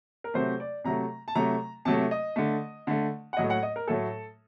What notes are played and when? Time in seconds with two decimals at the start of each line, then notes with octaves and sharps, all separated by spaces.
0.24 A#4
0.34 C3 F#3 A3 C5
0.60 D5
0.84 C3 F#3 A3 A#5
1.28 A5
1.35 C3 F#3 A3 A#5
1.85 C3 F#3 A3 A5
2.11 D#5
2.36 D3 A3
2.87 D3 A3
3.33 F#5
3.37 A2 F#3 A3 D#5
3.50 F#5
3.63 D#5
3.76 A#4
3.88 A2 F#3 A3 A4